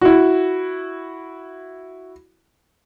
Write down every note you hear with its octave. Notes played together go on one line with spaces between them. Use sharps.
E4 F#4